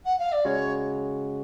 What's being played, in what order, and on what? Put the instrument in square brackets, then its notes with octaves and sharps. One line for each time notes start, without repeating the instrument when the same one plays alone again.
[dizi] F#5
F5
D5
[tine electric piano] C#3 G#3 C#4 F#4 [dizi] C#5